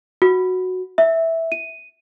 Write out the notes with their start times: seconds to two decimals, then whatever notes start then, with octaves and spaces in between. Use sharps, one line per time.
0.22 F#4
0.98 E5
1.52 D#7